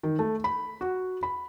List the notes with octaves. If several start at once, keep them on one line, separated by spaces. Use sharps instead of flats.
D#3
A3
B5
F#4
B5